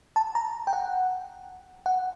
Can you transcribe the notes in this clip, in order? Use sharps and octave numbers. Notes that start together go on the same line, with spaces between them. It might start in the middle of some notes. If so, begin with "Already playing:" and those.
A5
A#5
G5
F#5
F#5